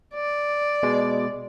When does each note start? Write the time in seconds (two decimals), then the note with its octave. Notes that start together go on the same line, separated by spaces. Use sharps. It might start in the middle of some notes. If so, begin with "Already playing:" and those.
0.15 D5
0.83 B2 G#3